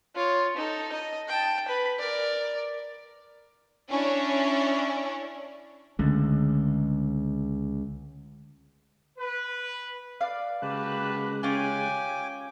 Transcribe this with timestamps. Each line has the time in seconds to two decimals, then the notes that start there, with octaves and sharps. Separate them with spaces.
0.15 F4 C#5
0.57 D#4 A4
0.92 D#5
1.27 G5 A5
1.68 B4 B5
1.99 A#4 D5
3.90 C#4 D4 E4 C#5
5.99 C#2 D3 A3
9.18 B4
10.21 B4 D5 F5
10.62 C#3 G#3 A#3 F#4 G4 B4 A5 F#6
11.43 C#4 F4 G4 G5 G#5 D6